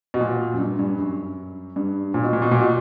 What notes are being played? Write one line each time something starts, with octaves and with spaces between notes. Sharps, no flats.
B2
A#2
F#2
G2
G2
F#2
G2
A#2
B2
A#2
B2
A#2
B2